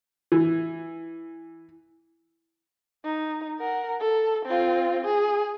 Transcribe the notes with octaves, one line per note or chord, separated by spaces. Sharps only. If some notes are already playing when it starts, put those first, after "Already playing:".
E3
D#4
A#4 F#5
A4
C4 F4
G#4